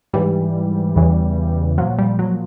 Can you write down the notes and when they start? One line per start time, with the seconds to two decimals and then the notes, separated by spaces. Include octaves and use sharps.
0.13 G#2 E3 G3
0.96 E2 C#3 E3
1.78 A#2 F3 F#3
1.98 G3
2.19 F#3